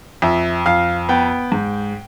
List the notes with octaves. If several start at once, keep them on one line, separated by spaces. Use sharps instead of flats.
F2 E5
F2 F5
B3 G5
G#2